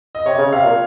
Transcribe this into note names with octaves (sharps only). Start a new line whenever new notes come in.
D#5
C3 C#5
C#3
C3 F5
A#2